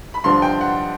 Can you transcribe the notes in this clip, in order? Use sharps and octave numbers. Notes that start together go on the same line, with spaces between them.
B5
G2 D3 F3 C6
G5
F#5